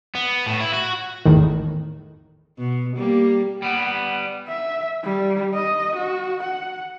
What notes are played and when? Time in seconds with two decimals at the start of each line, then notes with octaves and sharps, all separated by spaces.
0.15 B3
0.46 A2
0.61 E4
0.74 F#4
1.26 G#1 E2 A2 D#3
2.59 B2
2.96 G3 A#3
3.62 G3 B3 F#5
4.48 E5
5.04 G3
5.55 D#5
5.96 F#4
6.43 F#5